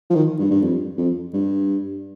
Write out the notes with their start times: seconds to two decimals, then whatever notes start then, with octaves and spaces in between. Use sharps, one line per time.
0.10 F3
0.15 D#3
0.39 G2
0.51 G2
0.62 F2
0.98 F2
1.33 G2